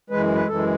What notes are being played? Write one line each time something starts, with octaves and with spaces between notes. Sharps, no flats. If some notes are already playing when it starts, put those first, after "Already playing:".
F#2 E3 G#3 B4
B4
F#2 E3 G#3 A4